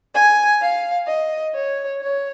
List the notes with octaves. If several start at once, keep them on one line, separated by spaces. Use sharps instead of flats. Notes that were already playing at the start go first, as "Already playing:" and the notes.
G#5
F5
D#5
C#5
C#5